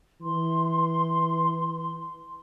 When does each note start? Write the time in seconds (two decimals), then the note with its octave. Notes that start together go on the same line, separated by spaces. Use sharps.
0.22 E3 C6